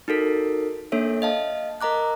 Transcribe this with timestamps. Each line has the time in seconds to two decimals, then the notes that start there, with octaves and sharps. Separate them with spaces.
0.08 D#4 F#4 A4 A#4
0.92 A#3 D4 A4 C#5 E5
1.22 D#5 F5 A5
1.81 A#4 D#5 A#5 D6 F#6